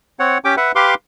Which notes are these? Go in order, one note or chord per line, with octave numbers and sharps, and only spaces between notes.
C4 C#5 F#5
C#4 G4 G5 D6
B4 E5 F#5
G4 B4 F5 C6 D6